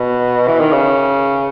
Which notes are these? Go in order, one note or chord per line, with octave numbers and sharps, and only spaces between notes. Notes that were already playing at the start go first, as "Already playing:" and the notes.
Already playing: B2
E3
D#3
C#3